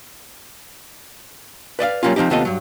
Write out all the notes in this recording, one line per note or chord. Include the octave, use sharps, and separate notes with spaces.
B4 D5 D#5 F5
F#3 G3 A#3 C#4 F4
C3 F3 C4 D#4 G4
D#2 C3 B3 F4 A4 D#5
G2 F#3